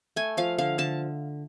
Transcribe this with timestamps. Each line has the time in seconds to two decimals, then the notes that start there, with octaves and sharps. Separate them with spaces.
0.16 A3 G#5
0.37 F3 F5
0.58 D3 F5
0.78 D3 A5